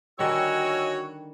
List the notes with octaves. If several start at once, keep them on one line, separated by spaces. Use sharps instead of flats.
D3 D#3 G3 F#4 C#5 D#5 G#5 E6